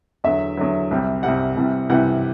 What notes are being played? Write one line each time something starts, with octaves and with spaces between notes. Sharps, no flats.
E2 D3 F#3 E5
E2 D3 F#3
C2 C3 G3
C2 C3 G3 F#5
C2 C3 E3 G3
C2 C3 E3 G3 F#5